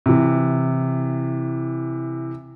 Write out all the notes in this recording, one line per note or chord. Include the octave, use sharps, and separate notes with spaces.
C3 E3